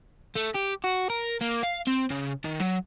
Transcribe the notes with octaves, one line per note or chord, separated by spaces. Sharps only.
A3
G4
F#4
A#4
A#3
F5
C4
C#3
D#3
F#3